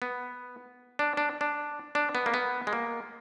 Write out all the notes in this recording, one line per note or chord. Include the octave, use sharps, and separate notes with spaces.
B3
D4
D4
D4
D4
B3
A#3
B3
G#3
A#3